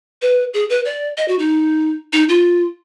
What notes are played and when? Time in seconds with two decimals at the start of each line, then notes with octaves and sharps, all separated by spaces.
0.22 B4
0.54 G#4
0.70 B4
0.85 D5
1.18 D#5
1.28 F#4
1.39 D#4
2.13 D#4
2.29 F4